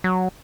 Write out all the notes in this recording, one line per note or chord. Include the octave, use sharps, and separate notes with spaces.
F#3